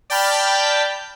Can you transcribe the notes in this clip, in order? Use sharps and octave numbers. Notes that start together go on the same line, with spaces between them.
D5 G5 A5 B5 F6 G6